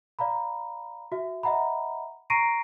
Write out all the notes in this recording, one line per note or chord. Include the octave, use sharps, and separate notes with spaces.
D5 F5 A#5 B5
F#4 E5
D#5 E5 F#5 A#5 B5
A#5 C#6 A#6 C7 D7 D#7